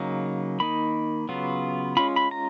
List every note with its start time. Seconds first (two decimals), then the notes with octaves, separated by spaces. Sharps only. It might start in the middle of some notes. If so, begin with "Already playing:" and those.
Already playing: C#3 F#3 A#3 D#4
0.60 D#3 A#3 D#4 B5
1.29 C#3 F#3 B3 F4
1.97 G#3 C#4 F4 B5
2.16 B5
2.31 A#5